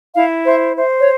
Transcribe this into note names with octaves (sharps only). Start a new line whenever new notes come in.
E4 F5
C5 E5
C5 E5
C#5